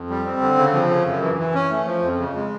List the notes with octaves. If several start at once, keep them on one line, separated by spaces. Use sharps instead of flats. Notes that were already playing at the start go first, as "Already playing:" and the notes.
Already playing: F2
G3
C4
D3
C#3
F3
C#3
F#2
E3
E3
C#4
A3
F3
F2
C#3
G#3